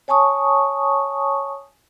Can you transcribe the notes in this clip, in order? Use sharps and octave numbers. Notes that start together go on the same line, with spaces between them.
C#5 G#5 A5 C#6 D#6